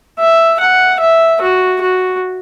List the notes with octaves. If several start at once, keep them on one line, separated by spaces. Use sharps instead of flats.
E5
F#5
E5
F#4
F#4